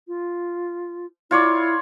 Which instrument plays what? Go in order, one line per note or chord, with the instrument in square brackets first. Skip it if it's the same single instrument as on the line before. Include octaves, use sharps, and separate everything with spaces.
[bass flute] F4
[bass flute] E4 [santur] F4 C#5 D5